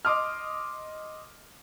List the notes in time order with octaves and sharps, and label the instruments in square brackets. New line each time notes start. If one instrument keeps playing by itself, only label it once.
[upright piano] D#5 C6 D6 D#6 F6